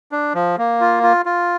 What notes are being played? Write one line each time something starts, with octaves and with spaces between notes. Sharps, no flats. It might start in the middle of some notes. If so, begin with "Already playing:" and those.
D4
F3
A#3
F4
F4
F4